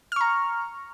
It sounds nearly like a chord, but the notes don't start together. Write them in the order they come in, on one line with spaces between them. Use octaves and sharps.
F6 C#6 A#5